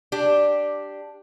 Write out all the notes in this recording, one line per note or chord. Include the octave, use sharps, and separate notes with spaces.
D4 G4